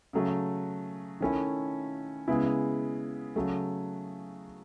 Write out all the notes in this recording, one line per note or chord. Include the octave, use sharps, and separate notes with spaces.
C#3 F#3 A3
D#3 A3 C#4 E4
C#3 G#3 B3 E4
C#3 F#3 A3